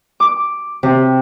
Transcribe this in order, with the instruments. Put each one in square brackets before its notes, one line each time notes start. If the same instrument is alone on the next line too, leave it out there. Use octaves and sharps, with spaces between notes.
[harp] D6
C3